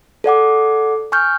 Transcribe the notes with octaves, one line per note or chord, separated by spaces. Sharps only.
A4 D5 F#5 D6
G#5 C#6 F6 G6